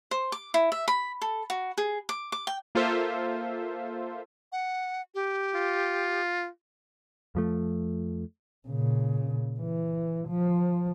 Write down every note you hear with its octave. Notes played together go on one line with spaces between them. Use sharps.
C5
D6
E4
E5
B5
A4
F#4
G#4
D6
D6
G5
A#3 F4 A4 C5 E5
F#5
G4
F4
F2 F3 A3
A#2 C#3
E3
F3